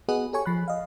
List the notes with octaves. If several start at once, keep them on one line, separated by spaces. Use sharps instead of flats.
B3 F#4 G#4 B4 D#5 F#5
G4 A4 C#5 G#5 C#6
F3 B5 F#6
D#5 F5